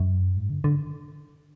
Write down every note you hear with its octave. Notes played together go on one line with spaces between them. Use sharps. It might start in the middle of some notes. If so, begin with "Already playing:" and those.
Already playing: F#2
G#2
D3
D3